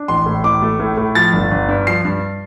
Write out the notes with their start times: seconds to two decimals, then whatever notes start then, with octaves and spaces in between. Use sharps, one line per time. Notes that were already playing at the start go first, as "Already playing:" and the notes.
Already playing: D4
0.08 A1 C6
0.26 A2
0.44 A1 D6
0.62 A3
0.79 A2
0.97 A2
1.15 F3 A6
1.33 G1
1.51 G1
1.68 G2
1.87 F3 C7
2.05 G2